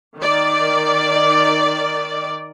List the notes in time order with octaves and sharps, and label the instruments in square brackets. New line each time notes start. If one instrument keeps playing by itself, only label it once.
[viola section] D#3 D5